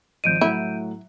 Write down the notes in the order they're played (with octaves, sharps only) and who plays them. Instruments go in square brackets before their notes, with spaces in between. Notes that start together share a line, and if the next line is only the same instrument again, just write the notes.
[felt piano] G#1 F3 D#5 [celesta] G6 D7 D#7
[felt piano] A2 F#3 F#5 [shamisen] E4